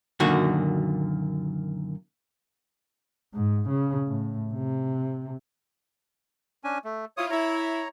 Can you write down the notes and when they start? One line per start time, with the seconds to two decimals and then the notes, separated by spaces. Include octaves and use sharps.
0.20 F#2 A#2 D3 D#3 F#4
3.34 G#2
3.69 C#3
4.07 A2
4.53 C3
6.64 C#4 D4 G#5
6.85 A3
7.17 E4 F4 C#5 D#6
7.31 E4 C#5 A#5